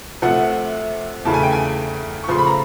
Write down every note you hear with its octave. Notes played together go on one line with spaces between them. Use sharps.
C3 F3 A3 F#5
E2 C#3 E3 A3 A5
G#5
G5
G#5
C#6
C#3 F3 A3 C6
B5
A#5